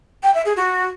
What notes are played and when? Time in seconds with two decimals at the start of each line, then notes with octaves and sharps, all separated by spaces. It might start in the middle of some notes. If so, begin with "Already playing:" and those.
0.23 G5
0.34 E5
0.46 G#4
0.57 F#4